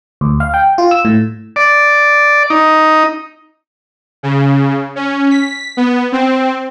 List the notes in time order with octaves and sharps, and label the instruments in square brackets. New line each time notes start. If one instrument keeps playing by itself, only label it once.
[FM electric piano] D2
F5
G5
F4
E6
A2
[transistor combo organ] D5
D#4
[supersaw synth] C#3
C#4
B6
B3
C4